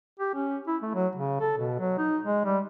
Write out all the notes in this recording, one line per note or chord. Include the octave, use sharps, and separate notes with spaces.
G4
C#4
E4
A3
F#3
C#3
A4
B2
F#3
D#4
G#3
G3